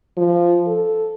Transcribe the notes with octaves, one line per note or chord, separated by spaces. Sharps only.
F3
A4